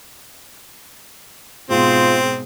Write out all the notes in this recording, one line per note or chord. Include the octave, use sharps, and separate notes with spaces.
G#2 B2 C4 F4 G#4